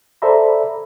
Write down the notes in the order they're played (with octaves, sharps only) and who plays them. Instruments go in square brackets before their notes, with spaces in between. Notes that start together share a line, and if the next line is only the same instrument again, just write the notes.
[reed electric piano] A4 C5 D5 E5 A#5 B5